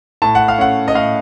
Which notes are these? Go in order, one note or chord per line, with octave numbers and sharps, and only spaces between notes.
A2 A5
F#5
F5
A3 C#4 F#5
D#5
A2 F5